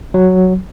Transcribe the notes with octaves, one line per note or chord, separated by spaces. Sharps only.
F#3